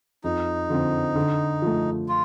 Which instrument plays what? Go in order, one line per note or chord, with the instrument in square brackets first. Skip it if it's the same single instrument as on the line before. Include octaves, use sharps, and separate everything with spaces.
[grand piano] F2 [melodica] D#4
[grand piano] D3 F3 C4
D3
F3 A3
[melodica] F4